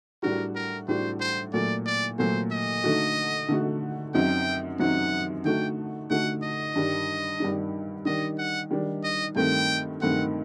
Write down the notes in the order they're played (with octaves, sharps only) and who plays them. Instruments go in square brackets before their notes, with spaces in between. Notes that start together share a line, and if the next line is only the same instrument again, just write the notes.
[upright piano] A2 G3 D4 F#4 [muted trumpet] A#4
[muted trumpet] A#4
[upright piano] A2 G3 D4 F#4 [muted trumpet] C5
[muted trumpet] C5
[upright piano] A#2 F#3 A3 [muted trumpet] D5
[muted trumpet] D5
[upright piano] A#2 F#3 A3 [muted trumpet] C5
[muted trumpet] D#5
[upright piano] D3 A3 D#4 F#4
D3 A3 D#4 F#4
[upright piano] F#2 F#3 C4 D#4 [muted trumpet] G5
[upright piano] F#2 F#3 C4 D#4 [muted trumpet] F#5
[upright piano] D3 A3 D#4 F#4 [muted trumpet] G5
[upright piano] D3 A3 D#4 F#4 [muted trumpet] F#5
[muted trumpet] D#5
[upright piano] G2 D#3 G3 D4
G2 D#3 G3 D4
[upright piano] D#3 G3 D4 [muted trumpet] D#5
[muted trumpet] F#5
[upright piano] D#3 G3 D4
[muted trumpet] D#5
[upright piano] G2 D#3 A3 C4 [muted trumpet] G5
[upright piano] G2 D#3 A3 C4 [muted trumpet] F#5